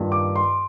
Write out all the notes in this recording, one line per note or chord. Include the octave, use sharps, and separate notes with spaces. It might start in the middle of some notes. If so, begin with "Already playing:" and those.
Already playing: G2 D#3 A#3 F4
D6
C6